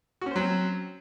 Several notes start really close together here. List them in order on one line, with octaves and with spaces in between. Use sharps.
F#4 C#4 C5 F#3 C4